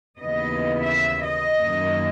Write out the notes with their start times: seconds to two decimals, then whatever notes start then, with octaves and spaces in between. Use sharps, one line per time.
0.20 D#2 C#3 E3 B3 D#5
0.89 E5
1.24 D#5
1.60 F#2 D#3 A#3